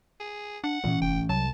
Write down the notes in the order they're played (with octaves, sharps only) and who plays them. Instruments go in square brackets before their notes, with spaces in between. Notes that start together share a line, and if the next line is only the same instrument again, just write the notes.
[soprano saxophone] G#4
[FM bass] D4 [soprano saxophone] F#5
[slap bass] A1 E3 C#4 [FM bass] A#2
[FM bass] F1 [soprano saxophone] G5
[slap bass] C2 [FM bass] F#3 [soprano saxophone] A5